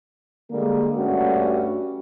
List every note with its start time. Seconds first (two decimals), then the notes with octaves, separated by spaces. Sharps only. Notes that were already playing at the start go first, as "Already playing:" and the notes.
0.51 D3 G3 G#3 A#3
0.96 G2 G3 A3 C#4 F#4